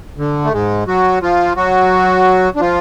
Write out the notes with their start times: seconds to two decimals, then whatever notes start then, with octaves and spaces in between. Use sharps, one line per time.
0.18 D3
0.45 A3
0.53 G#2 G#3
0.87 F#3 F#4
1.22 F3 F4
1.57 F#3 F#4
2.56 D4
2.61 F3 F4